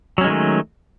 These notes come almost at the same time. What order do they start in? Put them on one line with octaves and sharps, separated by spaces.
F#3 C#4 G#3 D#3 A3